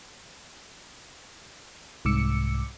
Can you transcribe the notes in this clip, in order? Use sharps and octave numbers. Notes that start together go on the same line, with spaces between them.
C2 G#2 D6 E6 C#7